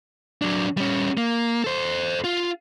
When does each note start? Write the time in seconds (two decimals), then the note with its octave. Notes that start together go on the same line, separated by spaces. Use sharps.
0.42 F#3 D4
0.77 G3 C#4
1.17 A#3
1.64 A4 C5
2.24 F4